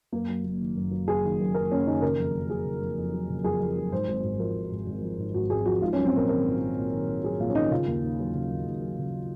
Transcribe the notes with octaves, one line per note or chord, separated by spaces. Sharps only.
F#2 A#3
F#3
F#1
D#3
F#2
F#3
F#1 G#4
D#3
F#2
F#3 A#4
F#1 C#4
D#3 D#4
C#3 A#4
F2
F2
F#3 G#4
C#3
F2
F2
F#3
C#3
F2 G#4
F2
F#3
G#2 C5
G#1
G#1
F3 A#4
G#2
G#1
G#1
F3
G#2
G#1 F#4
G#1 G#4
F3 F#4
G#2 F4
C#4
F#3
C4
A#1 A#4
D#3 A#4
G#2
F#3
A#1
D#3
G#2
F#3 G#4
A#1 F4
C#4
D#3 D#4
C#3 F4
D#2
D#2
F#3
C#3
D#2
D#2
F#3
C#3